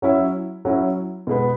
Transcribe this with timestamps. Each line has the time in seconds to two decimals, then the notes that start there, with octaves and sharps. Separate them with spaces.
0.02 F#3 C#4 E4
0.65 F#3 C#4 E4
1.27 B2 G#3 B3